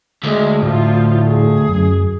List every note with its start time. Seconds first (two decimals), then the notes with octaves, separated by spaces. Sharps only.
0.23 D2 G#3
0.62 A2 F3 F4
1.28 G#4
1.69 F#2